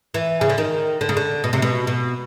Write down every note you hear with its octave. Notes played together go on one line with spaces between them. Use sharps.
E3
C#3
D3
D#3
D3
C#3
D3
B2
C3
B2
B2